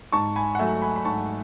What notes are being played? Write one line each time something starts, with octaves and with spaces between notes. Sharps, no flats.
G#2 A5 C#6
G#5 B5
F#5
F#3 A3 E5 G#5
G#5 B5
B5
G#2 A5 C#6